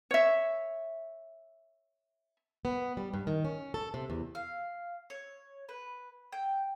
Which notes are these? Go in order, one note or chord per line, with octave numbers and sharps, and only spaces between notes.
C#5 E5
B3
G3
G2
D#3
C#4
A4
C3
E2
F5
C#5
B4
G5